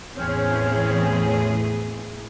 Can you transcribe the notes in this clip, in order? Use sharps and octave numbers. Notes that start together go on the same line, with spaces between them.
E2 A2 E3 C4 C#4 G#4 C#5